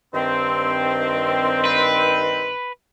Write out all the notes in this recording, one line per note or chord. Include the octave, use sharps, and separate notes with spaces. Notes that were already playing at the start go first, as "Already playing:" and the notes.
G2 D#3 C4
B4